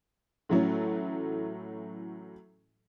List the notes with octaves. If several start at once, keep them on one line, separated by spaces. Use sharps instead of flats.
A2 E3 F#3 A3 C#4